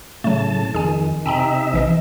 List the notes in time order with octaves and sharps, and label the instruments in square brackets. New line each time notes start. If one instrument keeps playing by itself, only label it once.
[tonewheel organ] A2 C#3 A5 [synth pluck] F#3 A3
[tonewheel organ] F2 D#3 [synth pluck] G#4 G#5
[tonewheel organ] C3 D#4 E5 [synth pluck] G5 G#5 A#5
[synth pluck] A#1 E3 D#5